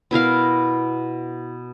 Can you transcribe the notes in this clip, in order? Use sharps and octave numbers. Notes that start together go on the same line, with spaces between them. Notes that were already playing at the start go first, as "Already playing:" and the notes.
B2 E4 A#4 F5